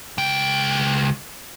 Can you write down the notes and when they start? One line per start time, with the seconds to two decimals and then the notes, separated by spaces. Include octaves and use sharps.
0.18 C#2 G5